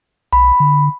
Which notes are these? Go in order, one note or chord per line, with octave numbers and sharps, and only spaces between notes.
B1 B5
D3